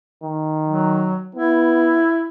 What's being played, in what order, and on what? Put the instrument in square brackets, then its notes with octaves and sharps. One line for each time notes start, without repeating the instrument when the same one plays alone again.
[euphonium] D#3
[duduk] F#3
[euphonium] B3 [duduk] E4